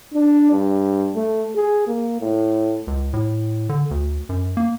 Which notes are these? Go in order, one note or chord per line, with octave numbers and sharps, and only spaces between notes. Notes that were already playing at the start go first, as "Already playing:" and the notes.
D4
G2
A3
G#4
A#3
A2
C#2
A2
D3
D2
F#2
A#3